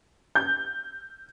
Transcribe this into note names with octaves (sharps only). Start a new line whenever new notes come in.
G6